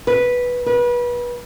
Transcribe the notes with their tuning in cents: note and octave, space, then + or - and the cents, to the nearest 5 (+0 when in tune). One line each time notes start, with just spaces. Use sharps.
B4 -5
B4 -30